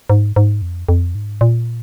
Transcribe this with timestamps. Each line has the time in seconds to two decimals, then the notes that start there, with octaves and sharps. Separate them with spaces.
0.10 G#2
0.36 G#2
0.62 F2
0.89 F2
1.15 G#2
1.41 A#2